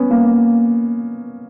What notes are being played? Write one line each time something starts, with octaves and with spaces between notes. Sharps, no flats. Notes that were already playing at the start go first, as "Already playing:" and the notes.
Already playing: B3 C#4
A#3